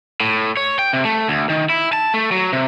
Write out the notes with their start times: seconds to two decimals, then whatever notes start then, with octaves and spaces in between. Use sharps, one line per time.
0.20 A2
0.57 C#5
0.79 G5
0.93 C3
1.05 A3
1.28 D2
1.50 D#3
1.70 E4
1.93 A5
2.14 A3
2.31 F#3
2.53 C3